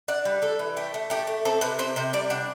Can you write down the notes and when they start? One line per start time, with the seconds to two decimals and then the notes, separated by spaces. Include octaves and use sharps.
0.08 D4 F#5
0.25 G3
0.42 G3 A4
0.59 E3
0.77 A3 G4
0.94 A3
1.10 A3 G4
1.27 A3
1.45 C4 A4
1.61 C3 B4
1.79 C4 C5
1.96 C3 C5
2.13 G3 D5
2.30 D4 F#5